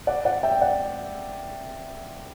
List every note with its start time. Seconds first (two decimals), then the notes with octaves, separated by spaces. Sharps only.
0.07 D5 F#5
0.25 D5 F#5
0.43 E5 G5
0.61 D5 F#5